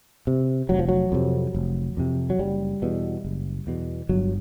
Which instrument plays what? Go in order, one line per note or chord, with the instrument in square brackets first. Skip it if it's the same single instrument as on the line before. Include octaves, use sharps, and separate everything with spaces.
[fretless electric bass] C3
F1 F#3
F3
F#3
F2 C3
F1
F2 C3
F#3
F#1 G3
E2 B2
F#1
E2 B2
G1 F#3